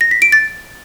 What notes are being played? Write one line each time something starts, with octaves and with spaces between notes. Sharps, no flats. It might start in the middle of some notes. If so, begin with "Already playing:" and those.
A#6
B6
D7
A6